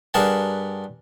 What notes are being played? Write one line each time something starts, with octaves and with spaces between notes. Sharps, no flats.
G2 G#4 A#4 F#5 A5